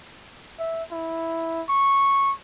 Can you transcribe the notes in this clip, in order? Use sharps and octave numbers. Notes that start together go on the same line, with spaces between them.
E5
E4
C#6